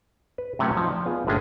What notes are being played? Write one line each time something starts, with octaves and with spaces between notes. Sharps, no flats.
B4
A2 C3 F#3 A3 C#4 F#5
F3 D#4
D5
B3 F4 G#4
G1 A2 G#3 C#4 D4 G#4